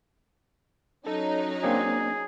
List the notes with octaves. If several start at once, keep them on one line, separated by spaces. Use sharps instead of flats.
F#3 C#4 D#4 A4
A#3 C4 D4 G#4